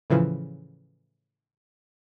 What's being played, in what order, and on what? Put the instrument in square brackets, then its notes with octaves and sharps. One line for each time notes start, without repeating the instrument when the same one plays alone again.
[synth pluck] A2 C#3 E3 F3